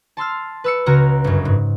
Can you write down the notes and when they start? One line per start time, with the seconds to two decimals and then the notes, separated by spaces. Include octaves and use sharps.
0.17 A5 C6 E6 F6
0.64 B4 E6 C#7
0.86 C#2 C#3 F#4 C#5 A#5 F6
1.24 G1 F#2
1.45 G#2